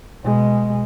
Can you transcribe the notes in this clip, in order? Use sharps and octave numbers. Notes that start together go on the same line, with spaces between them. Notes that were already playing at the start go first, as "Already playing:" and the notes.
B2 G#3